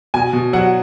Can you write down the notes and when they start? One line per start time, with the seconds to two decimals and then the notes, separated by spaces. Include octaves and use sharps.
0.14 B2 G#5
0.33 B2
0.53 F#3 F#5